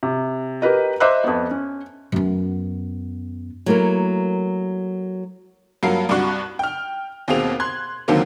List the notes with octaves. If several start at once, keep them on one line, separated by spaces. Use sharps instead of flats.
C3
G4 A#4 B4 D#5
C5 D#5 E5 D6 E6 F#6
F2 B3
C#4
F#2 B3
F#3 A3 A#3 E4 A#4
G2 F#3 A#3 F4 A#4 C7
C2 G2 D4 F#4 C#6 F#6
G5 F6
D#2 B2 A#3 C4 G#4 F7
C6 F#6 G#6
D#2 D3 D#3 F#3 A#3 C4